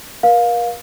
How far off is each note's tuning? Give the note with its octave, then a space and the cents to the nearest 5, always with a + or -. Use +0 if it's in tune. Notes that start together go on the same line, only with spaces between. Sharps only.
A#4 +40 F5 +15